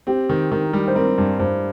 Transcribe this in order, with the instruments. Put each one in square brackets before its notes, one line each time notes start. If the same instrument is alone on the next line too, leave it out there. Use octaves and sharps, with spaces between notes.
[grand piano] C4 [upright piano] G4
[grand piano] D#3
[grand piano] D#3 [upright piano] A#4
[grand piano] G3
[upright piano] C5
[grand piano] C4 [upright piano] A#4
[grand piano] G2
[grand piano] G2 [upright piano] C5